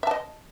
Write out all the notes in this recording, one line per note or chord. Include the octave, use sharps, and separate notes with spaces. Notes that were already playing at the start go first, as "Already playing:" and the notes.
D#5 E5 A5